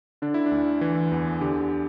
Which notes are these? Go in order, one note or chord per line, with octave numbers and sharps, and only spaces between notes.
D3 D4
E4
D4
D2
E3
E2
D3 G4